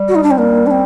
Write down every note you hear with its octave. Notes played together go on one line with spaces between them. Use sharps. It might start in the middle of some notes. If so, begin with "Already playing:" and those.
Already playing: G3
F#4
D#4
D4
C4
G3 A#3
D4
C4